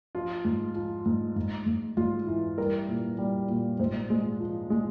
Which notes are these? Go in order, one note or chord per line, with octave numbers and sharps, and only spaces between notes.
F3 F4
G#2
F3
G#2
G#2
G#2
G#2 F4
E3
G3 A#4
A#2
G3
A#2
G#2 C5
G#3
F3
G#3